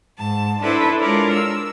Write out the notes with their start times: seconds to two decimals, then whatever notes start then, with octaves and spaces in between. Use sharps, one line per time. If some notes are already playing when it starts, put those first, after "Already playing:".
0.18 G#2 A5
0.62 D4 E4 A4 B4 C5 A5
1.00 G#3 D4 F4 A#4 C#5 D5
1.33 E6